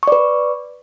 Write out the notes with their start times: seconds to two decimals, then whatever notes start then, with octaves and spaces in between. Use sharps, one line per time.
0.03 C#6
0.07 D5
0.12 B4